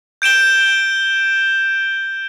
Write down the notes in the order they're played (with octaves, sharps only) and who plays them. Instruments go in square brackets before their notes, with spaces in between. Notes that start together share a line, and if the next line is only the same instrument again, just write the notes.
[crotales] G6 D7 E7 G7